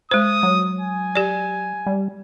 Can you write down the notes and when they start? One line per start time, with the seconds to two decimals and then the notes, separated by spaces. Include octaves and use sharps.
0.11 G#3 C5 D#6
0.43 F#3
0.80 G#5
1.15 G4 D5
1.86 G3